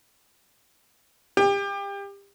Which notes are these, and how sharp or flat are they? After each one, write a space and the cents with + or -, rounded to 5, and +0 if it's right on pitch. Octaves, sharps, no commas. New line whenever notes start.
G4 +30